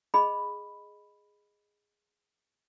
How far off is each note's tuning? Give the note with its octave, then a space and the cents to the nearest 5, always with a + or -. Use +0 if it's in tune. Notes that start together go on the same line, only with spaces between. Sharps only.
G#4 +0 D#5 -10 B5 +0